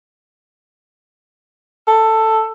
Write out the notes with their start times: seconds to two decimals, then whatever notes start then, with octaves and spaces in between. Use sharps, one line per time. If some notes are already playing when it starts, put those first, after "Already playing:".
1.88 A4